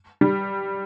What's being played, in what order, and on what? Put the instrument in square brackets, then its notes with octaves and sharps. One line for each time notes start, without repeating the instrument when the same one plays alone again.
[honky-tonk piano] G3